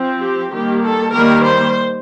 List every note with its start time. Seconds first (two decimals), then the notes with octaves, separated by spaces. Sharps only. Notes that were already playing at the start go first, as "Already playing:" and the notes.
Already playing: F3 C4
0.21 G4
0.51 D#3 G3 A#3 G4
0.82 A4
1.12 D#3 G3 A#3 A#4
1.44 C5